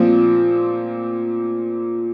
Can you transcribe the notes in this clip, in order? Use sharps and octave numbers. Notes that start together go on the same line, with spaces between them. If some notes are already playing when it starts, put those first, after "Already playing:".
Already playing: A#2 F3 C4